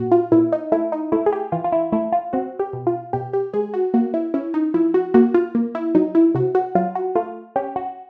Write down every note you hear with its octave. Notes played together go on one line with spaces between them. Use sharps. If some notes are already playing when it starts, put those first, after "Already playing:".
Already playing: A#2 F#4
F4
A#2 E4
D#4
A3 E4
D#4
A3 E4
G#4
G4
E3 F4
F4
E4
A3 E4
F4
C4 F#4
G4
B2
F4
B2 G4
G4
G#3 G#4
F#4
A#3 F#4
E4
C#4 E4
D#4
F3 E4
F#4
A#3 F#4
F4
A#3
E4
F#3 D#4
E4
C3 F#4
F#4
F#3 F4
F#4
A3 F4
C#4 G4
F#4